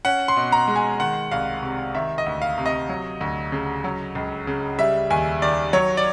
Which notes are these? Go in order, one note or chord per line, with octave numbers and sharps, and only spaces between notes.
C#4 F#5
C6
B2
A#5
G#3
G#5
D#3 F#5
C2 F5
C3
D#3 E5
D#5
D2
F5
C3
D#5
F#3
D2
C#3
F#3
C#2
C#3
G3 E5
D#2 G#5
D#3 D5
F#3 C#5
D5